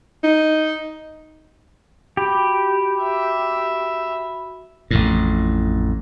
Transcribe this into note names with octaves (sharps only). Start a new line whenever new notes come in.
D#4
F#4 G4 B5
E5
A1 F2 A2